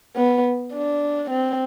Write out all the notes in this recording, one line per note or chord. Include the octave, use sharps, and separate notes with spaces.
B3
D4
C4